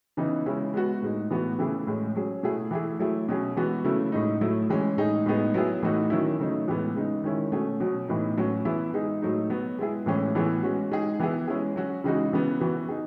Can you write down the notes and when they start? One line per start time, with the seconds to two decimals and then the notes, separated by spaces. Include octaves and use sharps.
0.17 C#3 E3 B3 D#4
0.46 C#3 G#3 C#4 E4
0.74 G#3 B3 F#4
1.02 A2 G#3 D#4
1.30 A2 E3 B3 F#4
1.59 C#3 E3 A3 E4 G#4
1.87 A2 G#3 C#4
2.16 F#3 C#4 G#4
2.43 B2 A3 E4 G#4
2.71 E3 A3 E4 G#4
2.99 F#3 A3 E4 G#4
3.29 B2 F#3 C#4 G#4
3.56 E3 G#3 B3 F#4
3.84 C#3 F#3 A3 E4
4.12 A2 G#3 D#4
4.41 A2 F#3 A3 E4
4.70 E3 G#3 C#4
4.97 A2 G#3 D#4 G#4
5.26 A2 G#3 B3 D#4 G#4
5.54 F#3 B3 E4 G#4
5.83 A2 E3 A3 D#4 F#4
6.10 D#3 F#3 C#4 E4
6.39 C#3 F#3 A3 D#4
6.68 A2 E3 G#3 B3
6.96 C#3 G#3 D#4
7.24 D#3 G#3 C#4 E4
7.52 B2 A3 C#4 G#4
7.80 B2 F#3 C#4
8.08 A2 E3 B3 D#4
8.37 A2 F#3 C#4 F#4
8.65 E3 B3 E4 G#4
8.94 G#3 D#4 G#4
9.22 A2 F#3 A3 D#4
9.50 F#3 B3 F#4
9.79 G#3 B3 E4 G#4
10.06 A2 E3 G#3 C#4 G#4
10.35 A2 E3 B3 E4 G#4
10.63 G#3 C#4 F#4
10.91 G#3 D#4 G#4
11.20 E3 B3 E4 G#4
11.48 G#3 C#4 E4 G#4
11.76 F#3 C#4 F#4
12.04 C#3 E3 G#3 D#4 F#4
12.33 C#3 E3 B3
12.61 E3 B3 F#4
12.89 D#4 G#4